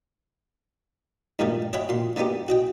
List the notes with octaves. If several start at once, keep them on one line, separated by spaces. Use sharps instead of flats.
G2 A#2 D#3 G3 A3
C#5 D#5 E5 F#5 G5 B5
A#2 C6
D3 A#3 B3 D#4 G4
F#4 D#5 G5